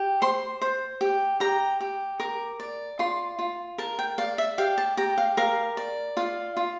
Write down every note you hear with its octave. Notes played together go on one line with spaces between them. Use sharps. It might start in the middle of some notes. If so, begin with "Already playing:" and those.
Already playing: G4
C5 C6
C5
G4
G4 A#5
G4
A#4 D6
D5
F4 C6
F4
A#4 A5
G5
D5 F5
E5
G4 F5
A5
G4 A#5
F5
A#4 F5
D5
F4 F5
F4